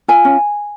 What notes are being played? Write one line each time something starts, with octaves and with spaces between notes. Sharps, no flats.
F4 G#5
C#4